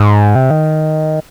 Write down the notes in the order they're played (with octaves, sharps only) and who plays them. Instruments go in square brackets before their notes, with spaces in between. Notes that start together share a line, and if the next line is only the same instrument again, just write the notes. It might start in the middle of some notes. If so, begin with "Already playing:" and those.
Already playing: [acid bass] G#2
C3
D#3